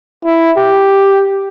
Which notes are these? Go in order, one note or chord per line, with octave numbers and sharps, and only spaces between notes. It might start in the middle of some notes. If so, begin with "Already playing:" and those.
E4
G4